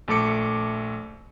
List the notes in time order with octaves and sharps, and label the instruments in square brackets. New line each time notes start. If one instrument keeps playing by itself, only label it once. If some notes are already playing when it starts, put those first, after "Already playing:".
[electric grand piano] A#1 A3 A4 D6 C#7